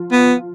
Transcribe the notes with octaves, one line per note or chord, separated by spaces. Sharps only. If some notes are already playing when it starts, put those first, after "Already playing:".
Already playing: F3 F4
B3